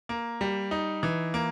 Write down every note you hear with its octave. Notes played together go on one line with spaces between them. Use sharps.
A#3
G3
D#4
E3
A#3